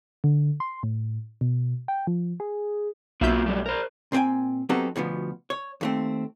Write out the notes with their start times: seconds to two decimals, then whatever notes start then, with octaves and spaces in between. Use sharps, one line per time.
0.24 D3
0.60 C6
0.83 A2
1.41 B2
1.88 G5
2.07 F3
2.40 G#4
3.21 B1 A#3 F4 F#4 E5 G6
3.46 F#3 G3 A3
3.66 A#4 C5
4.12 A#2 C4 C5 G5 G#5
4.69 F#3 B3 C4 D#4 G4 A4
4.96 D2 B2 F3 B3
5.50 C#5
5.81 D#2 A3 C4